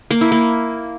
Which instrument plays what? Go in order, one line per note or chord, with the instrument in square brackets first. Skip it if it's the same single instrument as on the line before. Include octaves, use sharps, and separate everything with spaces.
[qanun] A#3
E4
A#3